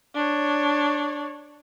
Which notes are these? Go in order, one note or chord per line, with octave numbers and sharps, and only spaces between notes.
D4 C#5